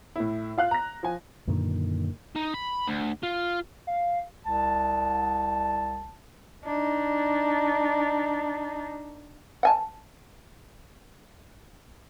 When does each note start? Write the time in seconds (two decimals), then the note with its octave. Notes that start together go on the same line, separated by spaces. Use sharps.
0.16 A2 E4
0.58 F4 F5 F#6
0.71 A#5 A#6
1.03 F3 G#5
1.48 F#2 A#2 D3 D#3
2.35 D#4
2.54 B5
2.88 D2
3.23 F4
3.87 F5
4.44 C2 A5
6.65 D4 D#4
9.63 F#5 G#5 A5